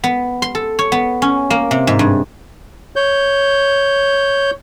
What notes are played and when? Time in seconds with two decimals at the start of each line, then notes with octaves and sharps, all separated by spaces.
0.04 B3
0.42 C6
0.55 A4
0.79 C#5
0.92 B3
1.22 C#4
1.50 A#3
1.71 C3
1.87 G#2
1.99 G2
2.96 C#5 G6